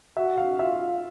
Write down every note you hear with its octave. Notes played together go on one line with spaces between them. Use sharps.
F#4 E5
F5
F4 E5